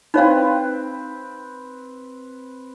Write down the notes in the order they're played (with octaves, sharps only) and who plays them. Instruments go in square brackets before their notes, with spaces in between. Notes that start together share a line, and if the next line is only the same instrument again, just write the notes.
[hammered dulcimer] C4 B4 [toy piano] D#4 C#5 F5